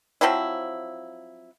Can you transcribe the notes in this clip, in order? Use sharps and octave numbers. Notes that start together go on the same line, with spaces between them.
F3 F#3 C4 E4